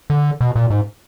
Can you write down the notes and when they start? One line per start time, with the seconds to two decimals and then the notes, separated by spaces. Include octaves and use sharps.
0.10 D3
0.41 B2
0.56 A#2
0.70 G#2